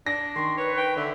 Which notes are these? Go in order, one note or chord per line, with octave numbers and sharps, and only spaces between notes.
D4 A#6
D#3 C6 C#6
B4 C#5
G5
D3 E5